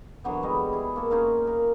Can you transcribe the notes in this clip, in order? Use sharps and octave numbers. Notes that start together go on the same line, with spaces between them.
D3 E3 F#3 B3
G3 G#3 D#5
E4 G#4
A#3 A4
C#4 D#4 F4 A#4
A#4